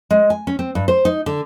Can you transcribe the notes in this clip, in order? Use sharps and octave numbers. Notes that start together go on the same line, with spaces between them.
G#3
G#5
C#4
C4
G2
C5
D#4
D3